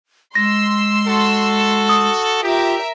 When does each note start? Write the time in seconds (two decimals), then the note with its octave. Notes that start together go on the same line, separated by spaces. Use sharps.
0.35 G#3 C6 E6 A#6
1.06 F#4 A4
1.89 D#6
2.42 F4 G4 A#4 E5